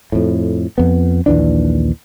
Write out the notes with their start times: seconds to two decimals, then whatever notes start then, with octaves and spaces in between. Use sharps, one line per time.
0.12 F2 A2
0.78 F2 B3
1.26 A#1 D#2 E3 D4